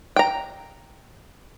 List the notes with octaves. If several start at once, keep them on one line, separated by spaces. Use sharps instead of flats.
G5 A#5